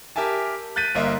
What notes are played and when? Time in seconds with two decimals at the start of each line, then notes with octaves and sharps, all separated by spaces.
0.16 G4 A#4 E5 G#5 A5
0.76 F#6 G6 A6 B6 D#7
0.95 G1 A#3 D#5 E5 C6